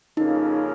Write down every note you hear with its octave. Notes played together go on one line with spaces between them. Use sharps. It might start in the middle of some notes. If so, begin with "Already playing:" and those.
F2 C#3 A#3 C#4 D#4